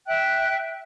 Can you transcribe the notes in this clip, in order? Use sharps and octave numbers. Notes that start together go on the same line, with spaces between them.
E5 G5 F#6